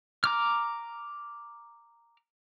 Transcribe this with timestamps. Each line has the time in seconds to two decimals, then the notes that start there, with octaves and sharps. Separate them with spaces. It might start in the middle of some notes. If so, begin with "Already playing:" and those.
0.24 A#5 D6 F6